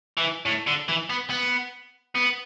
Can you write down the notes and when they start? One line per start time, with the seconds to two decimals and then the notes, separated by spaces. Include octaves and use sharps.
0.17 E3
0.45 A2
0.67 D3
0.88 E3
1.10 B3
1.30 B3
2.15 B3